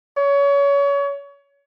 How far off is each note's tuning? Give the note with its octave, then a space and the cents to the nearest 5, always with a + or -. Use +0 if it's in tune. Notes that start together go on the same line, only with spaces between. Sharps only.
C#5 +30